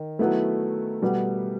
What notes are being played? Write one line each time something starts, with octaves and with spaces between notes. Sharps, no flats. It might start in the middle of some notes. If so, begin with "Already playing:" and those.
Already playing: D#3
F#3 A3 B3 E4
B2 G3 B3